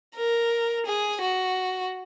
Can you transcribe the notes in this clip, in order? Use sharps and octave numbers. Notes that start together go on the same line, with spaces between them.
A#4
G#4
F#4